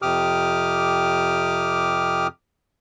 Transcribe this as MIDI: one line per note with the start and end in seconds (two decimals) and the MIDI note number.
0.02 2.27 41
0.02 2.27 48
0.02 2.27 67
0.02 2.27 86
0.02 2.27 87
0.02 2.27 89